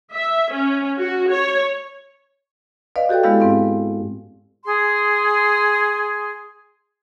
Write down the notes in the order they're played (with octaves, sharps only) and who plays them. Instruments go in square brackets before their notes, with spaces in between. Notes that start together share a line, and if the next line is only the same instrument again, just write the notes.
[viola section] E5
C#4
F#4
C#5
[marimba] B4 D5 D#5 F5
F#4 G4 A4 D5 G5
G#3 B3 E4 G4 A4 F5
G#2 C4 F5
[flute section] G#4 C6